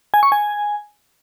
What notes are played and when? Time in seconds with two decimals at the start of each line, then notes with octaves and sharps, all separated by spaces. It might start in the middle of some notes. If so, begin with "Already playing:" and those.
0.14 G#5
0.23 C#6
0.32 G#5